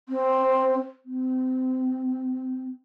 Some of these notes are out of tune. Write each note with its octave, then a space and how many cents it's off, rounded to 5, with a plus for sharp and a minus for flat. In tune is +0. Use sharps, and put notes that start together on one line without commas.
C4 +5
C4 -25